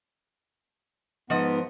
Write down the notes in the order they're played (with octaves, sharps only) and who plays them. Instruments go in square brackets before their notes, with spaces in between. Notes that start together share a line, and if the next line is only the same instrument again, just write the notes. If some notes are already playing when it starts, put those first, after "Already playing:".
[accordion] G#2 B3 [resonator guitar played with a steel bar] F3 D#5 [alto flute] F#5